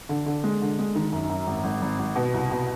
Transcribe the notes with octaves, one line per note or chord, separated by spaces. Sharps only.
D3
D3
G#3
D3
G#3
D#3
F#2
F#2
G#1
G#1
G#1
G#1
B2
C2
B2